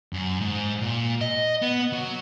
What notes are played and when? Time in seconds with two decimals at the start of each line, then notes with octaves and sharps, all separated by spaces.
0.13 F#2
0.41 G#2
0.81 A#2
1.21 D#5
1.62 B3
1.93 F#3